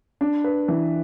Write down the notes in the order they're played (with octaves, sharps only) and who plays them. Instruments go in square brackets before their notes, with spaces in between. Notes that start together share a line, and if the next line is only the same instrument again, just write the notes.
[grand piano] D4
B4
E3